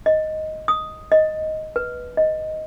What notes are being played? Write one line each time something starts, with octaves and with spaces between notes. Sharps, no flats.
D#5
D#6
D#5
B4
D#5